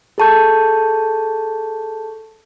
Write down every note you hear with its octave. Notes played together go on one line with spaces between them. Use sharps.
G#4 A4 A5 C#6 G6